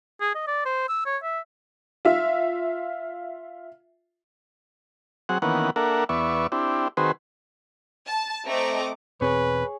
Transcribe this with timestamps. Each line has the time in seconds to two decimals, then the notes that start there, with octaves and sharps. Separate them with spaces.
0.21 G#4
0.35 D#5
0.47 D5
0.65 C5
0.89 E6
1.05 C#5
1.23 E5
2.05 F4 E5
5.29 F#3 C4 G#4 F#5
5.42 D#3 E3 A#3 B3 C#4 F#5
5.76 A#3 D4 A4 A#4 E5 F#5
6.09 E2 B3 D5 E5 C#6
6.52 C4 D4 E4 G4
6.97 D#3 C4 F#4 G#4 B4 C5
8.07 A5
8.46 A3 C4 D#5 A#5 D6
9.21 E2 B2 C4 G#4 B4 C#5